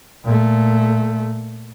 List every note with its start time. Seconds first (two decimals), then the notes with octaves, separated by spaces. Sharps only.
0.24 A#2 A3